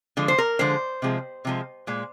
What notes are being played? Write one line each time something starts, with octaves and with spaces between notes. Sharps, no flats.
D3 F3 G#3
C5
A#4
D3 F3 G#3 C5
C3 F3 G#3
C3 F3 G#3
A#2 G#3